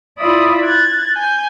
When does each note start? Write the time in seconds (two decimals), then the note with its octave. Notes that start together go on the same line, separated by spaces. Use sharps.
0.19 E4 F4 D5 E5 B5 D#6
0.63 F#6 G#6 A6
1.15 G#5 G6